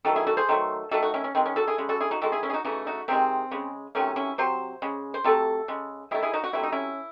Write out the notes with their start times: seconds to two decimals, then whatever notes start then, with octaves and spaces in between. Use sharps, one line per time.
0.05 D#3 F#3 A3 A4
0.16 E4 G#4
0.27 F#4 A4
0.37 G#4 C5
0.49 D#3 F#3 A3
0.91 D#3 A3 F#4 A4
1.02 D#4 F#4
1.14 C#4 E4
1.24 C#4
1.35 D#3 G#3 C4
1.46 C#4
1.56 F#4 A4
1.67 E4 G#4
1.78 C#3 G#3
1.89 F#4 A4
2.00 E4 G#4
2.11 D#4 F#4
2.21 D#3 G#3 F#4 A4
2.32 E4 G#4
2.43 C#4 E4
2.50 G#4
2.53 D#4 F#4
2.65 C#3 E3 A3 D#4 F#4
2.87 D#4 F#4
3.08 C3 D#3 G#3 C4
3.51 C#3 G#3
3.95 C3 D#3 F#3 A3 C#4
4.16 C#4 E4
4.38 C3 F#3 C5
4.82 C#3 G#3
5.14 C5
5.24 C3 F#3 A3 A4
5.68 C#3 G#3
6.11 D#3 E4 G#4
6.14 A3
6.23 E4 G#4
6.33 D#4 F#4
6.44 F#4
6.53 C3 F#3 A3 E4
6.63 D#4
6.72 C#4 E4